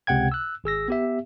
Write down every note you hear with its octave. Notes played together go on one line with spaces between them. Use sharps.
C#2 C3 F#5 G5 G#6
E6 F#6
G#1 G#4 E6 A#6
B3 G4 E5